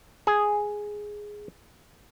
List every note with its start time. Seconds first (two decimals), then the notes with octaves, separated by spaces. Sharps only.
0.27 G#4